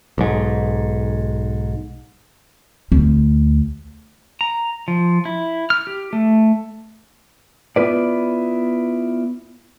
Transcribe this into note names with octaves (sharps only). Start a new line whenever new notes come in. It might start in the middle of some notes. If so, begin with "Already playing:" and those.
B1 G#2
D2
A#5
F3
E4
F6
G4
A3
B3 E4 F4 B4 D5